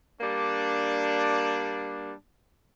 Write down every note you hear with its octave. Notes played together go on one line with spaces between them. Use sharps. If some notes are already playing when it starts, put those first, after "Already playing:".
G3 A#3 D4